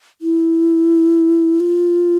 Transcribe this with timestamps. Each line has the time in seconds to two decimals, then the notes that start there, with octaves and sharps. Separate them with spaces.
0.22 E4
1.60 F4